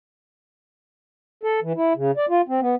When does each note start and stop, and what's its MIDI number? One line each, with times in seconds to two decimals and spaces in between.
1.43 1.60 69
1.62 1.73 52
1.76 1.93 64
1.95 2.11 49
2.17 2.26 74
2.29 2.41 65
2.48 2.60 60
2.61 2.75 59